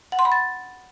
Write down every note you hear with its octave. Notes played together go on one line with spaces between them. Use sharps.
F#5
C6
B5
A6